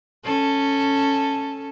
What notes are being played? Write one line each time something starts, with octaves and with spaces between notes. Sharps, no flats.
C#4 A4